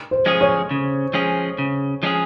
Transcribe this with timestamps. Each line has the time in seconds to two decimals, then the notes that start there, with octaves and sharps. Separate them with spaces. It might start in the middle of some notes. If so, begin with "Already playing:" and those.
0.11 C5
0.26 F3 G#3 C#4 G#4
0.41 C#5
0.71 C#3
1.13 F3 G#3 C#4 G#4
1.58 C#3
2.03 F3 G#3 C#4 G#4